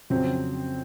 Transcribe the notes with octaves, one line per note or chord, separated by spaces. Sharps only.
F2 C#3 F#3 C4